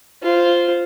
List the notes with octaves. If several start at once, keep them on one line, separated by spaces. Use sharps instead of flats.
F4 C5